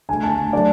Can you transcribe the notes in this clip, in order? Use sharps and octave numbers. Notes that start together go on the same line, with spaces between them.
D3 A3 G#5
A5
D3 F#3 A3 D5